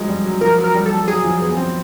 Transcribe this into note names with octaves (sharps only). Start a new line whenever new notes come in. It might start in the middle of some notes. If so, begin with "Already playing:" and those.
Already playing: F3 F#3 G#3
G3
F#3
F3 A#4
F#3
A#4
G3
A4
G3
F#3 G#4
F3
B3
C4